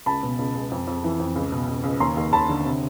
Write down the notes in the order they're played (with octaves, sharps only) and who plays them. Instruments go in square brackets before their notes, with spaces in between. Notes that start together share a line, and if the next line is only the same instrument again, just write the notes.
[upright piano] C#2 A5 B5
B2
C#2
C#2
F2
F2
E3
F2
C#2
B2
C#2
C#2
D#2 A#5 C6
D#2
D#2 A5 B5
D3
C3